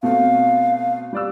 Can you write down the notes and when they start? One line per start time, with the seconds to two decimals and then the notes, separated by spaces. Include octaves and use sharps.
0.03 B2 A3 C4 F5
1.13 G3 D5 E6